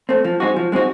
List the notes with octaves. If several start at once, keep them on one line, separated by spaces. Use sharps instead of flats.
A3 C4
F3
G#3 C4 D#4 F#4
F3
G#3 C4 D#4 F#4